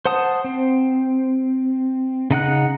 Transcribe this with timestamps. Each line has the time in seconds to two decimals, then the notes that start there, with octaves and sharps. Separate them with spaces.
0.05 C5 F#5 A5 D#6
0.44 C4
2.31 C#3 D#4 F#5 F#6